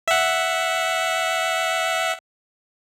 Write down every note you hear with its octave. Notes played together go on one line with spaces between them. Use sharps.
E5 F#5